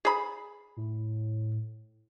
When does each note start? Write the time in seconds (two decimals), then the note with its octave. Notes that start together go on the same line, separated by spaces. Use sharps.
0.05 G#4 B5
0.77 A2